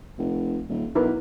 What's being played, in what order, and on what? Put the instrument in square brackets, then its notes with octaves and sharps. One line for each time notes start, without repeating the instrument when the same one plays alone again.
[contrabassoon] F1
D#1
[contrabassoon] B1 [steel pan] E4 A#4 B4